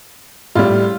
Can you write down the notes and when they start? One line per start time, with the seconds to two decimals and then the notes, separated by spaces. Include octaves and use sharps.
0.55 A2 G3 F4